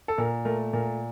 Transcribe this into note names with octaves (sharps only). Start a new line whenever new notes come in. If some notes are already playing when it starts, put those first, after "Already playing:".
A4
A#2 A#4
A3 A#4
A#2 A#4